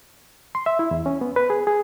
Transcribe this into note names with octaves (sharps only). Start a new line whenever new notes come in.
C6
E5
E4
E2
C#4
B3
B4
G#4
G#4